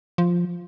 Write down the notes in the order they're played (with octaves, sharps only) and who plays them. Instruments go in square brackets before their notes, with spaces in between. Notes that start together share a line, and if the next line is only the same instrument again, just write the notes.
[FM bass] F3